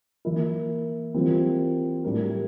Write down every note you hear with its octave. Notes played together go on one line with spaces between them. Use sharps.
E3 A#3 E4 A#4
E3 G3 C4 F4 A#4
A2 G3 D4 G4 A#4